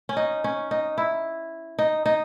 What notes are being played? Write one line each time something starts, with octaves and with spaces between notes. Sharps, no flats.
C#4
D#4
C#4
D#4
E4
D#4
D#4